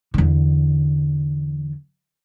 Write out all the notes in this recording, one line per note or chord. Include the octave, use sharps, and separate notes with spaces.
E2 D3